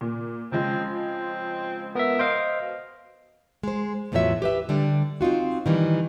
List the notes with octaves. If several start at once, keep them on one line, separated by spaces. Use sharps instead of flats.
A#2
C#3 F3 G#3 C4
C4
B3 A#4 E5
C5 D#5 F5 D7
B2
G#3 C5
E2 A2 F3 F#3 C#5 E5
G4 B4 E5
D3 G3 D4
C4 D#4 F4 F#4
D#3 E3 G3